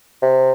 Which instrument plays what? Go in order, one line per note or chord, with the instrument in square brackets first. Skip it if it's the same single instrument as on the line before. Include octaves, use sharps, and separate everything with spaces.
[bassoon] C3